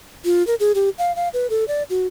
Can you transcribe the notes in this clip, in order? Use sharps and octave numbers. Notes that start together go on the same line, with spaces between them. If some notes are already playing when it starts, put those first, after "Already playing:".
F4
A#4
G#4
G4
F5
F5
B4
A4
D5
F#4